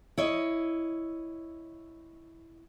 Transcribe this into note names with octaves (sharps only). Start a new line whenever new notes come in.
E4 C#5 D#5